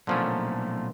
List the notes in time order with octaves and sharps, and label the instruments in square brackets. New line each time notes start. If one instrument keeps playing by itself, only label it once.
[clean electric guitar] B1 A#2 A3 [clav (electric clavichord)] D3 F3 C#4